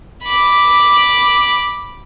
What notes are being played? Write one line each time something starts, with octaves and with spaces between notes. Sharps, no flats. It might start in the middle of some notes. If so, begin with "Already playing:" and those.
B5 D6